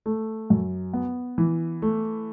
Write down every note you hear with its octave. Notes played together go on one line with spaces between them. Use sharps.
A3
F#2
B3
E3
A3